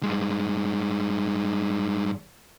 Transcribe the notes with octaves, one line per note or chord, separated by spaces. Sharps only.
G2 G#3